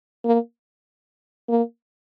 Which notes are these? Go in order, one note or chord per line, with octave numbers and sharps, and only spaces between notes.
A#3
A#3